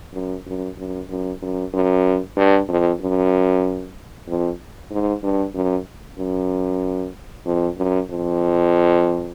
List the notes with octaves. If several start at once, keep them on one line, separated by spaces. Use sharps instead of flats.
F#2
F#2
F#2
F#2
F#2
F#2
G2
F2
F#2
F2
G#2
G2
F#2
F#2
F2
F#2
F2